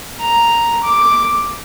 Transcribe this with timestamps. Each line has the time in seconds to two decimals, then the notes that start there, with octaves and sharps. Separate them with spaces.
0.20 A#5
0.83 D6